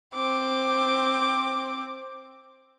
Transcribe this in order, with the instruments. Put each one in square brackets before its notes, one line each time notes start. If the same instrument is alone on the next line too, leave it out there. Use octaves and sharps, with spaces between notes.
[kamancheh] C4 D6